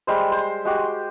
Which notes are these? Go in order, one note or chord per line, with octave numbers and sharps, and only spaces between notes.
G3 G#3 C5
C5
G#3 F#4 G4